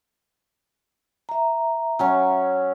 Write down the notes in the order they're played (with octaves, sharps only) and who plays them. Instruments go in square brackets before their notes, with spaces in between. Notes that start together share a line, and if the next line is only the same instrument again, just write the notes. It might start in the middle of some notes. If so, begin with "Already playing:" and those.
[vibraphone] E5 A#5
[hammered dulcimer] F#3 C#4 C#6